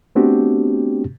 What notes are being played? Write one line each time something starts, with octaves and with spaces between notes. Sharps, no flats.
A3 B3 C4 D4 F#4 G4